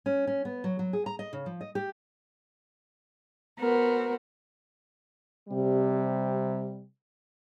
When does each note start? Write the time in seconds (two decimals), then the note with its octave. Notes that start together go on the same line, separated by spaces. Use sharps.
0.06 C#4
0.27 C#4
0.45 B3
0.64 F#3
0.79 F#3
0.93 G#4
1.06 A#5
1.19 D#5
1.33 C#3
1.46 F3
1.61 D#5
1.75 G4
3.60 B3 F#4 A#4 C5
5.49 C3 G3